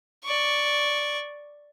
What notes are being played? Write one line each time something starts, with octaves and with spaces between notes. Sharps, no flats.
D5 C#6